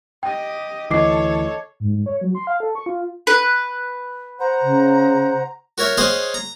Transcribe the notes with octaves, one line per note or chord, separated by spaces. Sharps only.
G4 D#5 G5
D2 E3 A4 C#5 D#5 D6 C7
G#2
G#2
C#5
F#3
C6
F5
A4
C#6
F4
B4
C5 F#5 A#5
C#3
F#4 A#4 C#5 E5
G#4 C5 C#5 D#5 F5 F#5
A#5